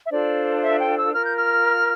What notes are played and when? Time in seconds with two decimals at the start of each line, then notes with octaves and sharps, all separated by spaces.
0.05 E5
0.10 D4 F4 A4 C5 D5
0.63 E5
0.79 G5
0.97 E6
1.13 F4 A#4 F6
1.24 G6
1.35 F6